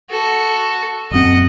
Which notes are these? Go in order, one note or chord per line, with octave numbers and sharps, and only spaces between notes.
F#4 A4
D#1 F#2 C4 D#5 F#5